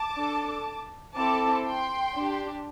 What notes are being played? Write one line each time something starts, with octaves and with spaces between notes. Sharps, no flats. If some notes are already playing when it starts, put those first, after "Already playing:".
Already playing: A5 D6
D4 A4
C4 E4 A4 A5 D6
G5 C6
D4 G4